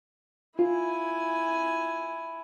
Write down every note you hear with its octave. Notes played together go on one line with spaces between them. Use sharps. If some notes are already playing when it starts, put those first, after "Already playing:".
E4 F4 G#5